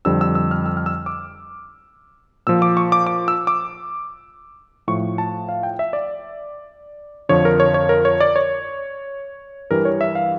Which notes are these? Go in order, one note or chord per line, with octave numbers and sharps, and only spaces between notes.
F2 D3 G3 E6
E6
E6
F6
E6
F6
E6
D6
A#2 F3 E6
D6
C#6
D6
D6
E6
D6
A2 F3 C#6
A5
F5
G5
E5
D5
F2 D3 F3 C#5
A#4
C#5
C#5
A#4
C#5
D5
C#5
G2 E3 G3 A#4
C#5
E5
F5